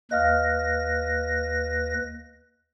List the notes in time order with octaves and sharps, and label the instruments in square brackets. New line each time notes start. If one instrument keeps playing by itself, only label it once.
[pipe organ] D#2 B4 A#6 [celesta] D#5 F5 F6